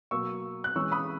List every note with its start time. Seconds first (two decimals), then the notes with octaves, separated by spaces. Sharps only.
0.11 B2 F#3 A#3 C#6 E6
0.64 F#6
0.76 E3 G#3 C#4 C#6 E6
0.92 B5 D#6